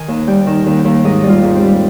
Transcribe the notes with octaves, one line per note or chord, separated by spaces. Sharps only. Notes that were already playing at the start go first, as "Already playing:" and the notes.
Already playing: D#3 G#5
D#2
G3 G5
D#3
D#2
G5
D#2
G#2 D#5
G3
F4
G#2
C4
G3